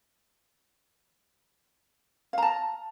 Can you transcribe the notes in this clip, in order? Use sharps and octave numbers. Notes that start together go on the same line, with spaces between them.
F5 A5 A#5